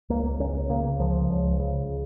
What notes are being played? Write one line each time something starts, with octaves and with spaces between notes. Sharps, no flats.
C#2 A#3
C#2 C#4
C#3 A#3
C#2 F3
C#2
C#3